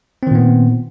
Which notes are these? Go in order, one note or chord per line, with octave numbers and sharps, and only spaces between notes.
A#2 D#3 B3 C4